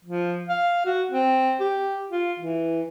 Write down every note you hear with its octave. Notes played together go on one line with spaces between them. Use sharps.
F3
F5
F#4
C4
G4
F4
E3